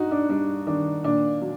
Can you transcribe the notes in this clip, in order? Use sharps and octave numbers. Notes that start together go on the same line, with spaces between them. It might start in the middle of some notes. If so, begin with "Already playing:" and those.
Already playing: G2 D#4 F#4
D4
G3 D4
D#3 D4
A#2 D4
F#3